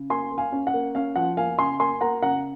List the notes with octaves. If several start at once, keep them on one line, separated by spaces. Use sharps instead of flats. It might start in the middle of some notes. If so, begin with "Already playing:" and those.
Already playing: C#3
A#3 G#5 C6
A#3
F5 G#5
C#4
F#5
A#3
C#4 F5
F3 F#5
A#3 F5 G#5
C#3 G#5 C6
A#3 G#5 C6
A#3 F#5 A#5
C#3 F#5 A#5